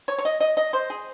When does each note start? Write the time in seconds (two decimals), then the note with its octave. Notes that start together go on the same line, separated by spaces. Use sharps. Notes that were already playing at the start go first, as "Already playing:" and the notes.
0.08 C#5
0.18 C#5
0.25 D#5
0.40 D#5
0.57 D#5
0.73 C5
0.90 G#4